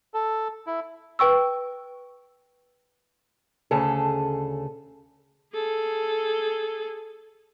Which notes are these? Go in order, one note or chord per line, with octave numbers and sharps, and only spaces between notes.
A4
E4
B4 G5 C#6 E6
D2 C#3 G#4 A4
G#4 A4